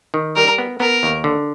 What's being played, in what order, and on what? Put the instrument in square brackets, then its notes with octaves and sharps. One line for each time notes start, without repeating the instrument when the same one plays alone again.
[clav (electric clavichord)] D#3
[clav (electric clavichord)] G3 [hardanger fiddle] A#4
[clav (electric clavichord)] B3
[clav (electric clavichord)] B3 [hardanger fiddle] A#4
[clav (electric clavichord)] D#2
D3